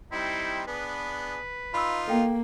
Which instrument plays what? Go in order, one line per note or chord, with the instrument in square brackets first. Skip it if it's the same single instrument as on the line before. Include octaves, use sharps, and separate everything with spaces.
[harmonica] G3 C4 D#4 [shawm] E4
[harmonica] B3 D4 G#4 [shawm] B4
[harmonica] D#4 F4 [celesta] B5 E6
[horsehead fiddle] A#3 [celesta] A4 F5 G5